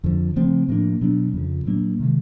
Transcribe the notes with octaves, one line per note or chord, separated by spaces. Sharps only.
F2 D3 F3
C#3 F3 A3 C4
A2 F3 A#3 D4
B2 F#3 B3 D4
F2 C#3 F3
A#2 F#3 A#3 D4
C3 D#3 G#3